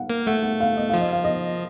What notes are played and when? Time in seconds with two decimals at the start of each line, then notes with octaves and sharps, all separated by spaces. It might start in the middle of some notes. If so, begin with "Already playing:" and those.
Already playing: F5 F#5
0.10 A#3
0.26 A3 F#5
0.43 F#5
0.60 F5
0.77 D#5
0.89 F3 F5
1.01 D#5
1.13 F5
1.24 D#5